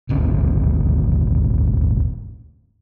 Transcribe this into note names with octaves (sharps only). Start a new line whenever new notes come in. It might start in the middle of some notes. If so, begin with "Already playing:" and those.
D#1 G#1 D2 C#4